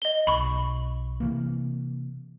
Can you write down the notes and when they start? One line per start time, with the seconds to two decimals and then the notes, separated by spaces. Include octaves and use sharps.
0.02 D#5 G7
0.27 B1 B5 C#6
1.20 C3 E3 A#3